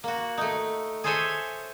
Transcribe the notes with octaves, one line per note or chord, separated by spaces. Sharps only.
A#3 F#4
A3 D#4
G#4 A4 C5 C#5 E5 G#5